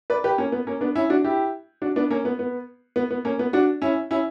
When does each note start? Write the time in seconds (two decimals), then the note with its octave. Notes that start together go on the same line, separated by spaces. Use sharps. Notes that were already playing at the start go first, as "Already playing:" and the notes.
0.10 B4 D5
0.24 G4 B4
0.38 A#3 C#4
0.52 B3
0.67 A#3 C#4
0.81 B3 D4
0.95 C#4 E4
1.10 D4 F#4
1.24 E4 G4
1.82 D4 F#4
1.96 B3 D4
2.11 A#3 C#4
2.25 B3
2.39 B3
2.96 B3
3.11 B3
3.25 A#3 C#4
3.39 B3
3.53 D4 F#4
3.82 C#4 E4
4.11 C#4 E4